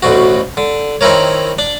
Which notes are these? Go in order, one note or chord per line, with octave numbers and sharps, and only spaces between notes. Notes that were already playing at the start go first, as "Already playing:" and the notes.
A1 D2 B2 F#4
D3
D#3 C4 E4 A#4 C#5
D4